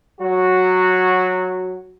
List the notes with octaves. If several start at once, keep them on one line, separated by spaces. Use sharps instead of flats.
F#3 F#4